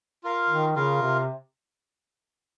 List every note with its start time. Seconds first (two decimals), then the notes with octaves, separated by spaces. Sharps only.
0.23 F4 A#4 F5
0.49 D#3
0.76 C#3 F4 A#4 F5
1.02 C3